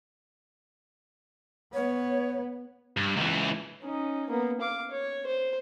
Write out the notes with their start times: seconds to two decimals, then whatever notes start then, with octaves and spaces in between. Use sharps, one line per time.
1.74 B3 C#5
2.97 G2
3.16 C#2 E3
3.82 C#4 D#4
4.30 A#3 B3
4.61 F5 D6
4.91 C#5
5.27 C5